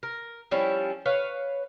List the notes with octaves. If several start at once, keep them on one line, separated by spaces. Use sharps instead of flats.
A#4
F3 G3 C#4 E4
B4 C#5 F5